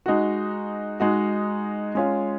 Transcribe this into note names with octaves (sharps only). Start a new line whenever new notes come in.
G#3 D#4 F#4
G#3 D#4 F#4
G#3 C#4 F4